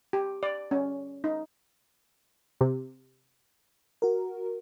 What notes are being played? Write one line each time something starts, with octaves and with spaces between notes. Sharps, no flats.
G4
D5
C#4
D#4
C3
F#4 A#4